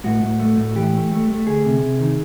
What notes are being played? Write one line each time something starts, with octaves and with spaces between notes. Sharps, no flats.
A2 F#4
A2
A3
A2
E3 G4
A3
A3
A3
D2 G#4
C3
C3
D#3